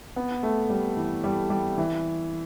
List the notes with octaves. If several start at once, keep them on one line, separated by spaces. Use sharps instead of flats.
B3
A3
G3
E3
G3
G3
E3